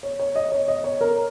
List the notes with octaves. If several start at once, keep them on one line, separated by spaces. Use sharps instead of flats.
C#5
C#5
D#5
C#5
D#5
C#5
A#4